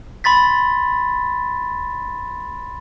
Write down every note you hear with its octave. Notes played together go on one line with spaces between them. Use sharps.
B5 C6 A6 B6